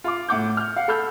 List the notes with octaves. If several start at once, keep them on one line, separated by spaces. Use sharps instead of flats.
F4 C6 D6
A2 F#5 D6 G6
F6 G6
F5 F#5
A4 B5 E6 F6 G6